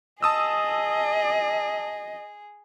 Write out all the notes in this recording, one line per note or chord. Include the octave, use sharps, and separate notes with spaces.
G#4 D#5 A5 D#6 E6